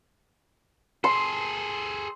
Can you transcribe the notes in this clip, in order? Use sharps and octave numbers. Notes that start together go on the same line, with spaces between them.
G#4 A4 C6